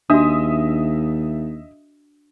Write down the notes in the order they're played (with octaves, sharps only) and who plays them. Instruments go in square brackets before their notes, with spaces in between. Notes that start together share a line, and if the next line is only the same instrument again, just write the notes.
[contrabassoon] D#2 [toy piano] D4 F#4 [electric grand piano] D#5 E5 D#6